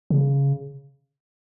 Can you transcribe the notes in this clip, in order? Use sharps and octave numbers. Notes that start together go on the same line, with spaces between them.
C#3